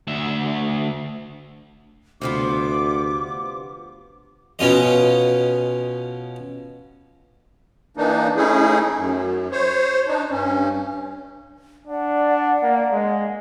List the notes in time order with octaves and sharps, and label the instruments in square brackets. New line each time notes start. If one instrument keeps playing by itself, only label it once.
[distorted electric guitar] D2 E5
[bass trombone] D2 [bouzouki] C3 F3 B3 [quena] D6
[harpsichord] B2 C#4 F4 D#5
[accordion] E3 A#3 D4 D#4
A3 C#4 D#4 E4 G#4
F#2
C5 C#5
D4 D#4
G2 C#4
[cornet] D4 [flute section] D5 F#5
[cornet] A#3
G#3